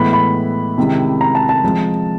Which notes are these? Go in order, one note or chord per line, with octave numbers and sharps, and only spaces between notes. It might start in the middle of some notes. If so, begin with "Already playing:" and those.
Already playing: A2 E3 G#3 B3 E4 B5
B5
C3 D#3 G#3 C#4 E4
A#5
A5
A5
F3 G#3 C4